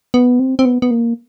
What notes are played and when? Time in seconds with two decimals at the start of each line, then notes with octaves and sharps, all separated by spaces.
0.14 B3
0.39 C4
0.59 C4
0.65 B3
0.82 B3
0.91 A#3